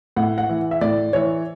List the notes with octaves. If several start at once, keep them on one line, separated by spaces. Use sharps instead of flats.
A2 F#5
F#5
E3
E5
A2 D5
E3 C#5